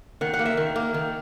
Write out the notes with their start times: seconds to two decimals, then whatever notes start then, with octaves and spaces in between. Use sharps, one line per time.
0.21 D#3 F#5
0.34 F#5
0.39 A#3
0.45 E5
0.57 D#3
0.76 A#3
0.94 D#3